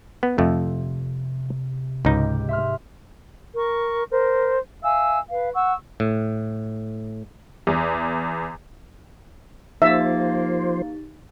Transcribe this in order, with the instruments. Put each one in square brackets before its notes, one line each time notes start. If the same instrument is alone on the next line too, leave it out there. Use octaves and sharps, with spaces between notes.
[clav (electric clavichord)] B3
[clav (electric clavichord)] F2 A3 [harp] C3
[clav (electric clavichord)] C#2 D#4 [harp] G#2 G4 D7
[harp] E5 C6 F6
[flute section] A#4 C#6
A#4 C5
E5 F5 G#5 E6
B4 F5
F#5 C#6 E6
[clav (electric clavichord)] A2
[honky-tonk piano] E2
[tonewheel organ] F3 C5 [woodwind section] A#3 [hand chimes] D#4 G4 A6 [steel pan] E5